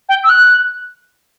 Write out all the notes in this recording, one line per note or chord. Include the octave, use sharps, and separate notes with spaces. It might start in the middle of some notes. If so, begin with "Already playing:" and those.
G5
E6
F#6